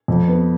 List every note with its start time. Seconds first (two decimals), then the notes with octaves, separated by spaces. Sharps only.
0.08 F2
0.28 B3